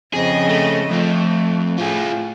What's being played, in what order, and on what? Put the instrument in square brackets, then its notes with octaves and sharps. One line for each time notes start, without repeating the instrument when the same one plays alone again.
[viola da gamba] F2 C#3 D#5 [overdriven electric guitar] G#4
[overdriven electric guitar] A3
[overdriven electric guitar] F2 F3 [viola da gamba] A3
[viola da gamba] A2 [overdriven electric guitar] F4 G#4